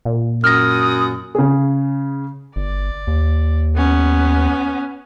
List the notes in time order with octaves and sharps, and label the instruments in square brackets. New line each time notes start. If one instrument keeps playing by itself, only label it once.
[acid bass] A#2
[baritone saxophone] F#2 [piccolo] D#6 [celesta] F6 A#6
[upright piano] C#3 G#4
[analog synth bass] G1 [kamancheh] D5
[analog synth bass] D#2
[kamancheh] B3 C#4